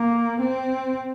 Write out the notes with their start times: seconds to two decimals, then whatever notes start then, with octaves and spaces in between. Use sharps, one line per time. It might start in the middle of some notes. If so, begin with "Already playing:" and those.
Already playing: A#3
0.41 C4